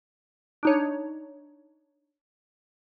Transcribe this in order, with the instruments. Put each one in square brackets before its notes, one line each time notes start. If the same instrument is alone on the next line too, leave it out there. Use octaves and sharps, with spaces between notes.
[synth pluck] D4 D#4 C#5